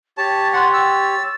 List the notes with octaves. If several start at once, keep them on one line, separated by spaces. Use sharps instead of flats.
G4 C#5 A5 A6
F#5 G5 C6 F#6
E6 A6